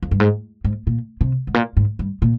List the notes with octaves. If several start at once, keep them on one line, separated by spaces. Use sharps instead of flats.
F2
G2
G#2
G#2
A#2
C3
G#2
A#2
G#2
G2
A#2